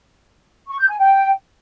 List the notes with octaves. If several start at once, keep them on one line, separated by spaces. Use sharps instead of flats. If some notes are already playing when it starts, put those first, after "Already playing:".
C#6
G6
G#5
G5